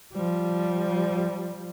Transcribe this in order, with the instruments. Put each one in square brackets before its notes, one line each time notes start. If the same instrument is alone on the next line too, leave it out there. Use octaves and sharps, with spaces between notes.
[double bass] F3 G3